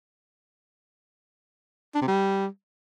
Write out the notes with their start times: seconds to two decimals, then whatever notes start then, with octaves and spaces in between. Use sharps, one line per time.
1.95 D4
2.01 C3
2.08 G3